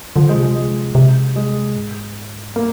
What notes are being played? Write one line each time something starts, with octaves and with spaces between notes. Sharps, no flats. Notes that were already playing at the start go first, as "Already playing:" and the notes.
D3 F3
G#3
C3
G#3
G#3
C3
G#3
G#2
A#3